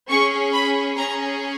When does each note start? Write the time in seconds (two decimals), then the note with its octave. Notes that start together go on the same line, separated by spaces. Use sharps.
0.09 C#4 G#4 C#6
0.53 B5
0.97 C#4 G#4 A#5